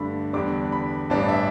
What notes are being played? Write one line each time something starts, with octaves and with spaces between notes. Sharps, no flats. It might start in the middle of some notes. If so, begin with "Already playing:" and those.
Already playing: G2 D3 A3 D4 B5
E2 D3 G3 D4 D6
B5
A1 G2 E3 G3 D4 A5
E5